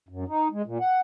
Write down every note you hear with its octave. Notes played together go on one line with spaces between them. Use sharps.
F#2
D#4
G#3
A#2
F#5